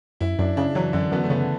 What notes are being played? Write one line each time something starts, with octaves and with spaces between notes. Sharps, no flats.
F#2 E4
F#2 D4
C#3 D4
E3 F#3
F#2 D3
F#2 B3
A3
C#3 B3